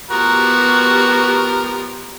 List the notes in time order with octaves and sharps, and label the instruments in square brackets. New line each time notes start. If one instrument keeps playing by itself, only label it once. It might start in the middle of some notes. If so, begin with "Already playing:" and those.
[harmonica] F3 A#4 [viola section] B3 G4 [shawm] F#4